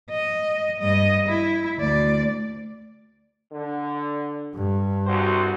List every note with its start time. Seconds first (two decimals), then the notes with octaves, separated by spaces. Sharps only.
0.11 D#5
0.80 G2 D#5
1.29 E4
1.79 D2 D5
3.50 D3
4.55 G2
5.06 C2 F#4 C5